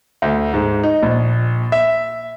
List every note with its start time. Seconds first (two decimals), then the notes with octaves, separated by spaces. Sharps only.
0.22 D2
0.54 G#2
0.83 D#4
1.03 A#1
1.72 E5